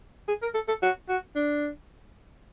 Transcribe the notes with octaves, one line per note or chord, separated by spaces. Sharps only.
G#4
A#4
A4
A4
F#4
F#4
D4